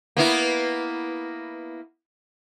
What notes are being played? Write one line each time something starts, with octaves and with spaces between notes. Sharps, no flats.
A#3 B3 E4